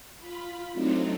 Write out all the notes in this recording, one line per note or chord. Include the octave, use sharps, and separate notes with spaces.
F4 B5
F#3 A3 C4 D4 D#4 F4